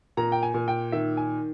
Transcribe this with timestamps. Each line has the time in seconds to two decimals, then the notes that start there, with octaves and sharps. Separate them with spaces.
0.17 A#2 A#5
0.32 G5
0.43 G#5
0.54 A#2
0.68 G5
0.92 D#3 E5
1.17 G#5